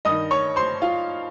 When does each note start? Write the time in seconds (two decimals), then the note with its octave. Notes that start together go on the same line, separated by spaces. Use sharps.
0.05 G2 D#3 D#5 D#6
0.31 C#5 C#6
0.56 C5 C6
0.82 F4 F5